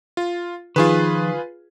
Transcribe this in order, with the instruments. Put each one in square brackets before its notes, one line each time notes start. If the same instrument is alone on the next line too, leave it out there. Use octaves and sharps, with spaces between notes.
[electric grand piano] F4
[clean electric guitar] D#3 F3 [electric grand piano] F4 G#4 B4